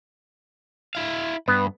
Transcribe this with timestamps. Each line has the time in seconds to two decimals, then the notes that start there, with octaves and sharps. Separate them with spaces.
0.95 E4 F5
1.48 G2 B3